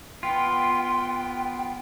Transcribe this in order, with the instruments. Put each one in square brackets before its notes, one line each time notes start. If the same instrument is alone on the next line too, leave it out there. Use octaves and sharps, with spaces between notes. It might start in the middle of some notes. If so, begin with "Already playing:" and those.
[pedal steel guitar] B3 F4 [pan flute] G5 [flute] C6